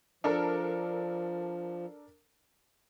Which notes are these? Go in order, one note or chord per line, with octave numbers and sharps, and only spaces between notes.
F3 D4 A4 A#4